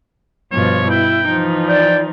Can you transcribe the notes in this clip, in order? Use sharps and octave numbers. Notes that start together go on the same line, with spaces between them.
G2 B2 F3 C#5
E4 G5
E3 F3 D#4
D5 G5